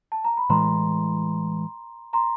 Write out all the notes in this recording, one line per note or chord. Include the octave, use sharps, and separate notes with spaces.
A5
A#5
B5
A2 E3 G#3 A#5 C6
A#5 C6